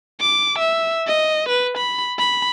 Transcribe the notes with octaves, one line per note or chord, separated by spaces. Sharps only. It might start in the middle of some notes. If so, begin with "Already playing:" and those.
D6
E5
D#5
B4
B5
B5